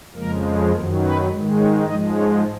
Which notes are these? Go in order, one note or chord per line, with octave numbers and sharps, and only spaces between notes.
F2 C#3 F3 G#3 A#3 A#4
F#2 D#3 F#3 A#3 A#4
B3 B4
G#2 D#3 G#3
C#4 C#5
G#2 F3 G#3 D#4 D#5
C#4 C#5